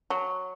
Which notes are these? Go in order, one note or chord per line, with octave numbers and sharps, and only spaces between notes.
F#3